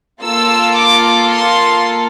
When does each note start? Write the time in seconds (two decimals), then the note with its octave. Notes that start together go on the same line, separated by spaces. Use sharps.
0.22 A#3 F4 A4 E6
0.76 D6
1.29 C6